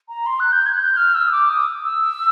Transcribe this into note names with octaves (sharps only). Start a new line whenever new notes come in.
A#5
C6
F#6
G6
G#6
F#6
G6
F6
E6
D#6
D6
D#6
E6